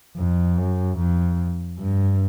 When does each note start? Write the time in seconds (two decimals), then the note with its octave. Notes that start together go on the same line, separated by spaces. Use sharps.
0.17 F2
0.58 F#2
0.98 F2
1.80 G2